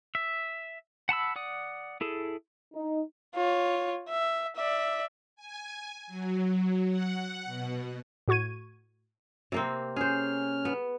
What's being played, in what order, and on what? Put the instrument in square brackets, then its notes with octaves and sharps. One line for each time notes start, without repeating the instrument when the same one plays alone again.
[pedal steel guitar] E5
F#5 A5 B5 E6
D5 F#5 D#6
E4 G#4 A4
[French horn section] D#4
[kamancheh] F4 C#5
E5
D5 E5
[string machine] G#5
F#3
F#5
B2
[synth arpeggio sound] A2 F#4 C#6 G#6 D#7
[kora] C3 A#3 C4
[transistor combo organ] C#4 F6 [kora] G#4 C5
[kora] B3